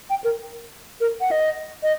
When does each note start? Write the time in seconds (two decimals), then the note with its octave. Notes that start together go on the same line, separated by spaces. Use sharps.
0.10 G5
0.24 A#4
1.01 A#4
1.21 F#5
1.31 D#5
1.83 D#5